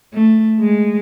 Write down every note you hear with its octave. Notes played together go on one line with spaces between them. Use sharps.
A3
G#3